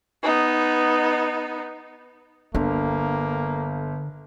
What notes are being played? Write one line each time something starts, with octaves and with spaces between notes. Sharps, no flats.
B3 D#4
G1 D3 A#3 D4